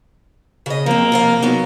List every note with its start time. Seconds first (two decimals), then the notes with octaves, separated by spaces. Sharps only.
0.66 C#3 D#5
0.86 F3 A#3 C4
1.12 C3 F3 F5
1.42 F#3 B3 D#4